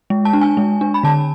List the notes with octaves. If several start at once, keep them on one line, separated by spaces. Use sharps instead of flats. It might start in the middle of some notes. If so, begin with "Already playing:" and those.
G#3
A5
D4
G#5
G#3
D4
B5
D3 A5